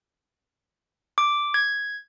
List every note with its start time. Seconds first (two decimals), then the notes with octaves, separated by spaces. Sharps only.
1.18 D6
1.54 G#6